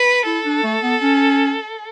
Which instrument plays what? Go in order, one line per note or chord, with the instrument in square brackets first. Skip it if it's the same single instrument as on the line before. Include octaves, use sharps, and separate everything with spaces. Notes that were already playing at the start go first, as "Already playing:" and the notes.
Already playing: [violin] B4
[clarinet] E4 [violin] A4
[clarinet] D4
A3
B3
C#4